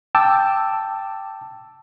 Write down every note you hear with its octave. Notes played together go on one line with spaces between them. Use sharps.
G5 A5 D6 E6